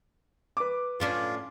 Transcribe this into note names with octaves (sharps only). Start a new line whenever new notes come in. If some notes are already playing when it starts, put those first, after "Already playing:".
B4 D6
A2 C#4 D4 F4